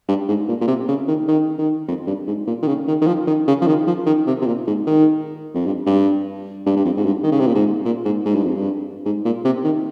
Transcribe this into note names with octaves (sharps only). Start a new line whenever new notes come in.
G2
G#2
A#2
A#2
C3
C#3
D#3
D#3
D#3
F2
G2
G#2
A#2
D#3
C#3
D#3
D#3
F3
D#3
C#3
F3
D#3
F3
D#3
C3
C3
A#2
G#2
D#3
F2
G2
G2
G2
G2
F2
G#2
G2
D#3
C#3
C3
A#2
G#2
A#2
G#2
G#2
G2
F2
G2
G#2
A#2
C3
D#3